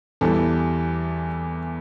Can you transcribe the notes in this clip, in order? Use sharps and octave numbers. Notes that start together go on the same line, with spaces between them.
E2 E3 G3 A4